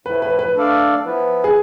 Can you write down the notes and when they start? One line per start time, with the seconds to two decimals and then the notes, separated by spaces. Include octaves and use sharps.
0.06 A2 F3 A3 E4 B4
0.22 B4
0.39 B4
0.55 A3 D4 A4 D5 F5
1.05 F3 B3 E4 B4
1.44 G#4